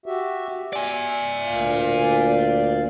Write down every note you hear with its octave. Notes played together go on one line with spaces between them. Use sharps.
F#4 G4 E5
D5 E5 G#5
D2 A#2 F5